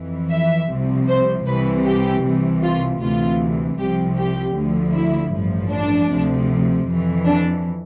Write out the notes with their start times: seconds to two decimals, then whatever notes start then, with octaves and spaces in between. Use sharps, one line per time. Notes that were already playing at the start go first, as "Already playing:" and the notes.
Already playing: F2 E3
0.31 E5
0.70 C2 C3 F3
1.08 C5
1.46 C2 C3 E3 B4
1.86 G4
2.23 C2 C3 E3
2.62 F4
3.01 D2 C3 E3 F4
3.78 C2 C3 F3 G4
4.17 G4
4.56 D2 D3 F3
4.93 E4
5.33 A1 G2 F3
5.71 D4
6.10 D2 C3 F3
6.87 F2 E3
7.26 D4